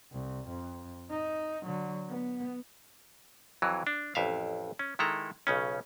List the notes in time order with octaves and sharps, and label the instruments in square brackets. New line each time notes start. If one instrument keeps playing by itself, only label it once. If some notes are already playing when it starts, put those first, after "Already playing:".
[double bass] C2
F2
D#4
D3 F#3
B3
[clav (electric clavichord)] F2 E3 F#3
D4
A1 F2 E5 F5
C#4
D#3 G#3 E4 A4 A#5
B1 C#3 C#4